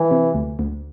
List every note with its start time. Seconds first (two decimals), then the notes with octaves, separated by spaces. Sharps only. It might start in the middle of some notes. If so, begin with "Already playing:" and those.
Already playing: E3
0.11 C3
0.34 D2
0.59 D2